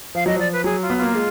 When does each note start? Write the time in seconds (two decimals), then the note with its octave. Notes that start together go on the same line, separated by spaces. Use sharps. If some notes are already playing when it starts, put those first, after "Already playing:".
0.15 F3 F5
0.26 F#3 D#5
0.36 F3 D5
0.53 B4
0.64 F#3 G#4
0.82 F4
0.90 B3
0.98 A#3 F4
1.15 G#3